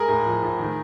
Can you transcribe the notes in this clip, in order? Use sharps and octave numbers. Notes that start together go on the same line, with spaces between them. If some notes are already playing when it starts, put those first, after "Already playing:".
Already playing: G#3 G#4 A#4
A2
F3
A2
D#3